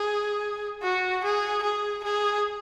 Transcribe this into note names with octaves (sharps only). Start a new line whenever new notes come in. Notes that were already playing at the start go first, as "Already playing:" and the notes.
Already playing: G#4
F#4
G#4
G#4
G#4